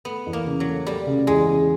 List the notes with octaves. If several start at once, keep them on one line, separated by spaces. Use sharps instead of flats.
A3 B3
E2
A#3
C#3
F#3
A3
G3 A3
C#3
E2 G#3
C#3